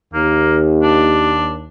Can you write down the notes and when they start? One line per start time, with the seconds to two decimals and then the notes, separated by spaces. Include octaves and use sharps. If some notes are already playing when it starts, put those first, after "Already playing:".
0.13 D#2 A#3
0.82 D4